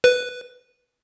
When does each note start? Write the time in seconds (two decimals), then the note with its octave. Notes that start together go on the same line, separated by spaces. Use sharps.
0.04 B4